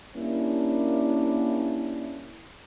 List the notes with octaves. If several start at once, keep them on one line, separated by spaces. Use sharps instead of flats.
G3 A#3 C#4 D4 E4